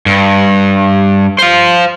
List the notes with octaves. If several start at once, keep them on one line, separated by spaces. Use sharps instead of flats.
G2
C5 F5